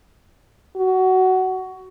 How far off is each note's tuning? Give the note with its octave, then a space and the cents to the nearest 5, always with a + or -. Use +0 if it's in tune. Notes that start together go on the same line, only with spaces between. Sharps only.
F#4 +15